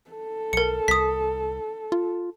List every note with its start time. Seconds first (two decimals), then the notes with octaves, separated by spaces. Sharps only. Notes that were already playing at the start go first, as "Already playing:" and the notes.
0.11 A4
0.53 B1 A#4 C#7
0.88 C2 D#6 B6
1.92 F4